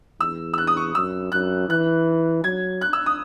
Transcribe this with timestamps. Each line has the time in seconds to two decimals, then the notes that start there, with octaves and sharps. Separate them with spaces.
0.20 E2 E6
0.54 E6
0.58 F#6
0.67 D#6
0.77 C#6
0.95 F#2 E6
1.32 F#2 F#6
1.69 E3 F#6
2.43 F#3 G#6
2.81 F#6
2.93 E6
3.06 D#6